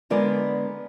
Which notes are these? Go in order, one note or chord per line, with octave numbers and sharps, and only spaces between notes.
D3 G#3 B3 A#4 D5